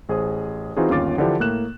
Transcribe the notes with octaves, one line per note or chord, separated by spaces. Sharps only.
A1 G#4 C5 D#6
E3 C4 D#4 F4 F#4 G#4
G1 D#2 C#4 F4 D6 A6
D3 E3 F3 D4 E4 G4
A2 A#3 F#6 E7